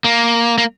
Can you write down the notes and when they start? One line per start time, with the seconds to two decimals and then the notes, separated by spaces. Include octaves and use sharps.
0.04 A#3
0.58 A#3